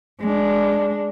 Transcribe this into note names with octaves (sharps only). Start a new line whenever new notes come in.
G#3 D4